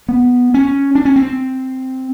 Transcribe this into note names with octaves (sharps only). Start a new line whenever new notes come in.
B3
C#4
D4
C#4
C4